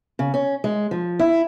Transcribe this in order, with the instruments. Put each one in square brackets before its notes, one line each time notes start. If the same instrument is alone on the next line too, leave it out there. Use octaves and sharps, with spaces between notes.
[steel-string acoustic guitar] C#3
C#4
G#3
F3
E4